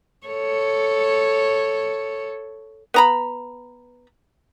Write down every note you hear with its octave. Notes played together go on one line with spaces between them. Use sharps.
A4 C#5
B3 A#5 B5